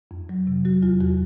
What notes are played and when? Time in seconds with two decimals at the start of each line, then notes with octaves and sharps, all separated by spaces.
0.11 F2
0.29 F#3
0.47 C3
0.65 F#3 F#4
0.83 E2 F4
1.00 E2 F#4